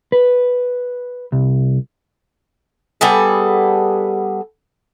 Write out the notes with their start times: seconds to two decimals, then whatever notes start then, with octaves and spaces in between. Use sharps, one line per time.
0.12 B4
1.32 C2
3.01 G3 B3 G#4 A4